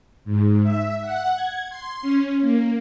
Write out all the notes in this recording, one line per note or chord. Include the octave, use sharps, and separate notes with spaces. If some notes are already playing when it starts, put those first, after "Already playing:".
G#2
E5
F#5
G#6
C6
C#4
A#3